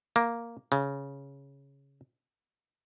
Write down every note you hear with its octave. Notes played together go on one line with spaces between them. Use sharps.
A#3
C#3